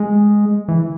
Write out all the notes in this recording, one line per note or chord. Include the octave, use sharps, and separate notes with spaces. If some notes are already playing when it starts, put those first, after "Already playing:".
Already playing: G#3
E3